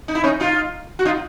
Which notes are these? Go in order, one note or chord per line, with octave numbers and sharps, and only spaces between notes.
D#4
E4
C#4 D#4
D#4 F4
F#4
D#4 F4